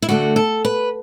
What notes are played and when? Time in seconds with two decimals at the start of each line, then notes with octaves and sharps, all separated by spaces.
0.02 E4
0.09 D2 D3 A3 F#4
0.36 A4
0.65 B4